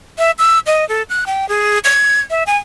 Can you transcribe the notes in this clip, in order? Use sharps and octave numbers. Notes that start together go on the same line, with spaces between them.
E5
E6
D#5
A4
F#6
G5
G#4
G#6
E5
G#5